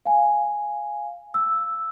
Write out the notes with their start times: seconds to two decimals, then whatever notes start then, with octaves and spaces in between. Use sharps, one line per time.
0.05 F5 G#5
1.34 E6